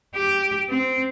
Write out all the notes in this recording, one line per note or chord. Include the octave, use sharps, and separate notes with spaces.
G4
C4